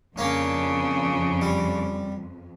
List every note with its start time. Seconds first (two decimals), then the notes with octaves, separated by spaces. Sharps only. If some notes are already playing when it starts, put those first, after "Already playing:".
0.18 F2 C#3 A#3 C#4 D4
1.42 G3